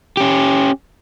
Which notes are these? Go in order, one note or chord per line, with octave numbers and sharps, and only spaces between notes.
C#4 G4